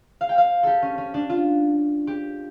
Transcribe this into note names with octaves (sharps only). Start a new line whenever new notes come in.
F5
G5
F5
G4 A4
C#4
C#4
D4
F4
G4